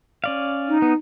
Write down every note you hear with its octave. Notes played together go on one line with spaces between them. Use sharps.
C#4 D5 F5
D#4
B3